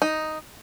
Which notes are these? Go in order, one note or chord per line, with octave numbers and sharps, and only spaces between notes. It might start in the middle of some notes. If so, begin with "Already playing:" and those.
D#4